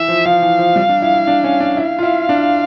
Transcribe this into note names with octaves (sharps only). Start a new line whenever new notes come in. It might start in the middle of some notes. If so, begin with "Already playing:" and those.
Already playing: E3 E5
F3
F3 F5
E3
F3
G3
D4
E4
E4
D4
C#4
D4
E4 F5
F4
E4
D4